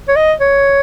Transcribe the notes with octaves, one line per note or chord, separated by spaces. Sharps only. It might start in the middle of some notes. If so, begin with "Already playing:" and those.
C#5
D#5
C#5